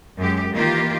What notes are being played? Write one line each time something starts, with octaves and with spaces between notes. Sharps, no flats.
F#2 G#3 G4
D#3 E3 A#3 F4 G4